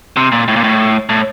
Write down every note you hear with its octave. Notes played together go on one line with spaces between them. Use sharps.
C3
A#2
A2
A#2
A2
A2